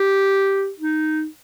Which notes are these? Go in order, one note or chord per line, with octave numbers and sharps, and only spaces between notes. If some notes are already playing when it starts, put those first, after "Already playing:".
Already playing: G4
D#4